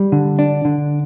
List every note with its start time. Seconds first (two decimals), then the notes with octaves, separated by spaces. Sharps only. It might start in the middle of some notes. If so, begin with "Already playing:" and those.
Already playing: G3
0.12 D3
0.39 D4
0.65 D3